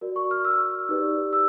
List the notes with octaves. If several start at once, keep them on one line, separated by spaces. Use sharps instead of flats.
F#4 A#4 D5
C#6
F6
E6
D#4 G4 B4 D5
E6